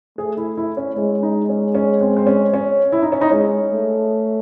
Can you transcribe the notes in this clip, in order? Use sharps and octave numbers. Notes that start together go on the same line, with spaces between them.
A3 G#4
E4
E4
C#4
G#3 C#4
D#4
C#4
C#4
C4
C4
C#4
C#4
E4
D#4
C#4
D#4
G#3 C#4
A3